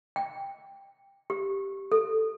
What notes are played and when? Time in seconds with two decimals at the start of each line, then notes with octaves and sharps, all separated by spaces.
0.16 G5
1.30 G4
1.92 A4